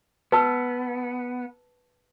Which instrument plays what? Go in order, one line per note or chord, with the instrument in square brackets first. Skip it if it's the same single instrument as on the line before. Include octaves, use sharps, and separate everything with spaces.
[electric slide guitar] B3 [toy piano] B4 A5 E6